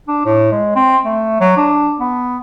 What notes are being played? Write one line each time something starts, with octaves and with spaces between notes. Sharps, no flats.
D4
A2
G#3
C4
A3
F#3
D4
B3